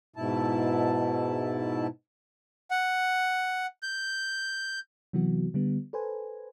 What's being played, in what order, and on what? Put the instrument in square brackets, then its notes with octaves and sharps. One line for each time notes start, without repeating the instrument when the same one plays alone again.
[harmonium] G#2 B2 E4 A5
[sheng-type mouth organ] F#5
G6
[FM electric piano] C3 E3 F#3 B3 F#4
D3 G3 B3
A4 B4 C5 G#5